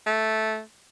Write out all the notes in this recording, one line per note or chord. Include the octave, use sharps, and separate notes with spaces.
A3